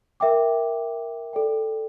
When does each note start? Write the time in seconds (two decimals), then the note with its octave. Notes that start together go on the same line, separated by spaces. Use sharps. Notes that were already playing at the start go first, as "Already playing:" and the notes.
0.20 A#4 E5 G5 D6
1.33 A4 D5 G5